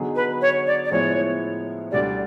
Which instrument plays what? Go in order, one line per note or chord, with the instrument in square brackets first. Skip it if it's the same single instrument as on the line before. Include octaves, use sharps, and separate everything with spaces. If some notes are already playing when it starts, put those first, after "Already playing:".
Already playing: [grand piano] D3 F#3 B3 D#4 G#4
[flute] B4
C#5
D5
D5
[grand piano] A2 F3 G#3 B3 E4 [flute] C#5
[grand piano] D2 D3 G3 [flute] D5